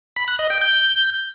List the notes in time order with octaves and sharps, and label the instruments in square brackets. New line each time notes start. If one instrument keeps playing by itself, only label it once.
[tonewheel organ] B5
F#6
D#5
G5
G6